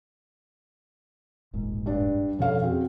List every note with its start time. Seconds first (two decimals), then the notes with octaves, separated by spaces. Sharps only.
1.53 E1 A#1 G#2
1.86 G2 D4
2.39 F2 B2 F3 C#4 A4 F5
2.63 C4 F#4 G#4